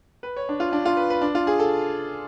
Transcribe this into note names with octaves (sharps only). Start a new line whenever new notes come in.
B4
C#5
D4
F4
D4
F4
B4
B4
D4
F4
G#4
A4